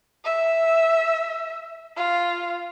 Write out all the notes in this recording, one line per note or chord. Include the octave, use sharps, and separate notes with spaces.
E5
F4